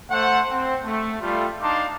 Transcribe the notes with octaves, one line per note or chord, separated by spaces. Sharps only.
A3 C5 F#5
C4
A3
G3 A3 F4
D4 D#4 F5 A5 C6 D6